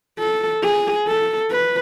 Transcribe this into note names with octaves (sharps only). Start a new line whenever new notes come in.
A4
G#4
A4
B4